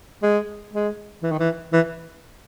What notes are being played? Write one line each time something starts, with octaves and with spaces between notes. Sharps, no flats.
G#3
G#3
E3
D#3
E3
E3